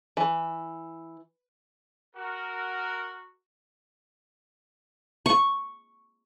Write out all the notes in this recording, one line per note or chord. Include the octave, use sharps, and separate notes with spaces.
E3
F#4 A#4
C#6